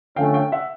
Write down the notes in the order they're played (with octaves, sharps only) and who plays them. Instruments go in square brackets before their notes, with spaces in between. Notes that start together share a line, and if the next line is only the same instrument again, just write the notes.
[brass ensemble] D3 F3 A3 C#4 [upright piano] F5 G5
[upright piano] F5 G5
E5 F#5